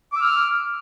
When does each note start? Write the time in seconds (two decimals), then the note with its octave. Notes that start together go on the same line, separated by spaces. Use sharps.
0.12 D6
0.17 E6
0.21 F6